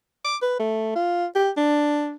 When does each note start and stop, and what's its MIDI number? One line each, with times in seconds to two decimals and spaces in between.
0.25 0.37 86
0.42 0.54 71
0.59 0.91 57
0.95 1.26 65
1.35 1.50 67
1.57 2.15 62